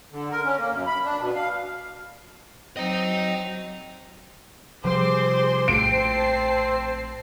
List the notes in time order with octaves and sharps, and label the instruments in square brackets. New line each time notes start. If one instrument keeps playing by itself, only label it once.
[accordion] D3
A#4
C#4
A#3
F#2
B5
D4
B2
F5
[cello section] F#3 [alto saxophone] C4 [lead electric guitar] D#5 A#5
[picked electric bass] C3 F3 G3 [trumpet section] C4 D6 [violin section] G#4 C5 C6
[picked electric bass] A#1 A2 [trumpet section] C4 [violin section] C5 A5 C7 [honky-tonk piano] D7